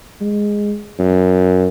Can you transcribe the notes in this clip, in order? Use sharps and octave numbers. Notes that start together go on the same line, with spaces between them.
G#3
F#2